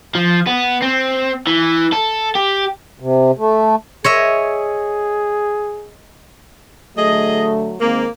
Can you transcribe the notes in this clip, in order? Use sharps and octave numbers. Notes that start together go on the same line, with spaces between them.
F3
B3
C4
E3
A4
G4
C3
A3
G#4 C#5 D#5 E5
D3 F#3 A3 G#4 D#5
D#3 G#3 A#3 C4